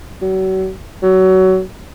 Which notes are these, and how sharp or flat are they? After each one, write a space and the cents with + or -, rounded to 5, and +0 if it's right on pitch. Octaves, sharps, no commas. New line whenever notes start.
F#3 +35
F#3 +20